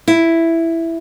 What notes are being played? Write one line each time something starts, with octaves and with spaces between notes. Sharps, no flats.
E4